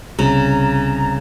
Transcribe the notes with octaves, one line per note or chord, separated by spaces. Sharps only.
C2 C#3 A#5